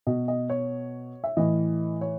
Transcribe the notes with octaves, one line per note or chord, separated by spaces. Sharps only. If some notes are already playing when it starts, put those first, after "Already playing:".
B2 D#5
D#5
C#5
E5
A2 E3 D#5
C#5